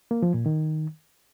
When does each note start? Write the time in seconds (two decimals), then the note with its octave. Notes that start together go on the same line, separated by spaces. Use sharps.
0.11 A#3
0.22 F3
0.34 A#2
0.46 D#3